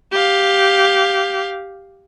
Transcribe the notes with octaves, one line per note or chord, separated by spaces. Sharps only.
G4 F5